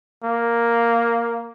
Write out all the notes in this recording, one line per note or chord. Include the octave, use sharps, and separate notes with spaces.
A#3